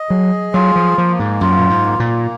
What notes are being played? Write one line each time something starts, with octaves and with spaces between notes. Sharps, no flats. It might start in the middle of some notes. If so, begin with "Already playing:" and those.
Already playing: D#5
F#3 G#4
F#3 F4
F3
F3 A#3
G#2
F#2 F4
A#2
G#2
A#3
A#2